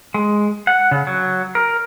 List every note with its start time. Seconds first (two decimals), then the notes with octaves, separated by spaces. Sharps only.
0.14 G#3
0.67 F#5
0.91 C#3
1.07 F#3
1.55 A#4